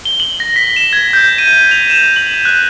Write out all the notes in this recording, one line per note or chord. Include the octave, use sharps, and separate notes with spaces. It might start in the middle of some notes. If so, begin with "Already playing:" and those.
G7
F#7
A#6
B6
E7
G#6
G6
D#7
F7
E7
F#7
F#6